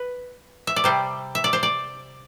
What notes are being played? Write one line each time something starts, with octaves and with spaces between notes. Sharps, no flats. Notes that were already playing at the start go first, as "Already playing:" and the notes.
Already playing: B4
E5
D5
C3 G3 C5
E5
D5
C5
D5